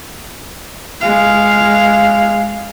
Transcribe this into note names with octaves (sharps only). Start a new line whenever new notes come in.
G#3 F5